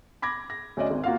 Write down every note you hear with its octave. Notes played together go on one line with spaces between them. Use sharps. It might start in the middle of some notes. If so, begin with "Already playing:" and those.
B5 D6 G#6 A#6
A#6
D2 C#4 D5 D#5
G#1
A#3 F4 F#4 F5